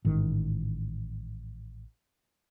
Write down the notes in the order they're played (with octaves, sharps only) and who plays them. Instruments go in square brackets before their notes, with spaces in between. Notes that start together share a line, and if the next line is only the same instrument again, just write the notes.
[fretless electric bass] A1 G#2 D#3